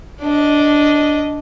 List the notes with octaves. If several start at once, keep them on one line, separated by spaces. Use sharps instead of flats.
D4 D#5